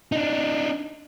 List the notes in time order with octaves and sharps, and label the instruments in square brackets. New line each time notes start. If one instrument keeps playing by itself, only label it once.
[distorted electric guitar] D4 D#4